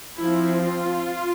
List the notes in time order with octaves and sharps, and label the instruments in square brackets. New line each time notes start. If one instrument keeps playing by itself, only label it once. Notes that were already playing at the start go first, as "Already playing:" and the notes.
[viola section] F3 C4 E4
F4